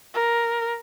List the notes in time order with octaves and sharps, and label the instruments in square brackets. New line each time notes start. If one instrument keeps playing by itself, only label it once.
[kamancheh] A#4